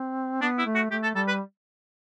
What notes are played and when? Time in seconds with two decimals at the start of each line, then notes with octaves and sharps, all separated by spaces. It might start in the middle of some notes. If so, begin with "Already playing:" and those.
Already playing: C4
0.41 B3 D4
0.58 E4
0.66 A3
0.75 F#4
0.91 A3 G4
1.03 A4
1.15 G3 A4
1.28 B4